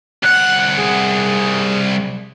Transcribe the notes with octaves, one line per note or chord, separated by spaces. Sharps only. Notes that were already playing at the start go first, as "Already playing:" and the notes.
C2 F#5 F#6
G#4